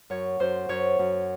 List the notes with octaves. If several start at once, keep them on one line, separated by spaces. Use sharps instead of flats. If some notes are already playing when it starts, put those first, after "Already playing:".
F#2 C#5
F#2 C5
F#2 C#5
F#2